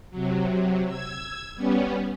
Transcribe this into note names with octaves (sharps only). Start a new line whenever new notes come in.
C3 F#3
E6 G#6
G3 B3 C#4